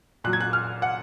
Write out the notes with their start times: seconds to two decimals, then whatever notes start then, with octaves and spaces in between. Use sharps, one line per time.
0.24 A#2 F#3 F#6
0.33 G#6
0.41 F#6
0.53 F6
0.82 F#5